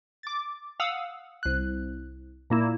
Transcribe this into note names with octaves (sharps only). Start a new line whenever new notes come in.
D6 A6
F5 F#5 D#6 E6
C2 F#6
A#2 A#3 E4